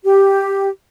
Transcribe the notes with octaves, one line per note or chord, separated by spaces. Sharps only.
G4